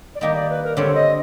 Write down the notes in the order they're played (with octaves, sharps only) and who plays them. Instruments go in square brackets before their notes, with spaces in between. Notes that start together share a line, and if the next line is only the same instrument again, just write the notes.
[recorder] D5
[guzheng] D#3 G3 A#3 D#4 G4 [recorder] D#5
[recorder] D5
B4
A#4
[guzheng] D3 G3 C4 [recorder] C#5
[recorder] D#5